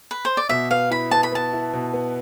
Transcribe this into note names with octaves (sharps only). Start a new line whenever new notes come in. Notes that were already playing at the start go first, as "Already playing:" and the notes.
B4
C5
D5
B2 E5
B4 F5
E4 B5
B4 A5
B5
B3 A5
E4
B2
B3